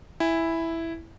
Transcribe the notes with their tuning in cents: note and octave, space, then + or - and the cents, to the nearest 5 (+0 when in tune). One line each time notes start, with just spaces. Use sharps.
E4 +0 G#5 -20